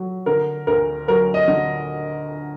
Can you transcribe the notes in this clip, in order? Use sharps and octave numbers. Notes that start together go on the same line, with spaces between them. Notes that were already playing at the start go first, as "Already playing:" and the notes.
Already playing: F#3
D3 A#4
D2 A#4
F#3 A#4
D#5
D3